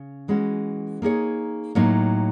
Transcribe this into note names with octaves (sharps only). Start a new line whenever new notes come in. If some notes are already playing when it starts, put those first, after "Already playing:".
Already playing: C#3
E3 G#3 C#4 F#4
A#3 D#4 G#4 C#5
A2 F#3 A#3 D#4